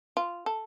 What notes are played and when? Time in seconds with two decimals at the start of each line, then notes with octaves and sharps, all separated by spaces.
0.17 F4
0.46 A4